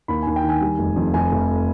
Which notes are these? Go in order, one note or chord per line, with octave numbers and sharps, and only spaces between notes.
D#2 B5
D#2 G#5
G5
D#3
G#5
G3
F1
F2
F1 G#5
F1